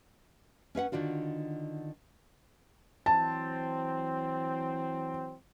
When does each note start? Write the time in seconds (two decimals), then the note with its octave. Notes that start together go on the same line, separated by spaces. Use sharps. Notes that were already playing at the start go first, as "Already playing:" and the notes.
0.75 C#4 B4 F5 F#5
0.92 D3 D#3 D4 F4 F#4
3.06 E3 F#3 C4 A5